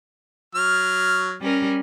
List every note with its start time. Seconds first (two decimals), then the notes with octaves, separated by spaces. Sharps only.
0.55 F#3 F6
1.41 G3 C#4 A#4